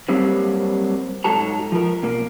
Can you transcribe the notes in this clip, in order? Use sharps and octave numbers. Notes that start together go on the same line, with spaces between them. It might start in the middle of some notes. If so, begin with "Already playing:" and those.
F#3 G3 A#3 C4
G#2 F#3 F#4 A4 A5 A#5
F3 A#4
B2 A#3